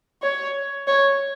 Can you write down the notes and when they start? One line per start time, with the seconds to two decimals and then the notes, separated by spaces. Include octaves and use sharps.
0.22 C#5
0.87 C#5